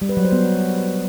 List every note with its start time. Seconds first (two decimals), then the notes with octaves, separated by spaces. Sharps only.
0.02 G3
0.09 B4
0.17 F#3
0.25 C5
0.32 B3